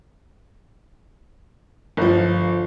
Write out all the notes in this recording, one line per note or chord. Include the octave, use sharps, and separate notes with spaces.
G1 F3